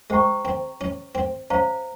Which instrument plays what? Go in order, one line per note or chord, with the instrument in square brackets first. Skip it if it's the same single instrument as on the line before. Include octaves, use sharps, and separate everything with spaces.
[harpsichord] G#3 [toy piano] G#4 C5 G5 A#5 C#6
[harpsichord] C4
C#4
C4
[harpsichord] C#4 [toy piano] C5 F5 A#5